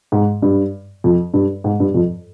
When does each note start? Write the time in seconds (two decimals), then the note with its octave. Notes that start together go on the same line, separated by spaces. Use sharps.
0.12 G#2
0.42 G2
1.04 F2
1.34 G2
1.64 G#2
1.80 G2
1.94 F2